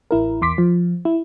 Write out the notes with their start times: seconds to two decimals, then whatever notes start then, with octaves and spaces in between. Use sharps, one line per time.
0.11 A1 E4 A#4
0.42 E2 C6 D6 B6
0.58 F3
1.05 E4